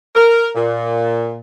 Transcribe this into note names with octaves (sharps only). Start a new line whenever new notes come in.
A#4
A#2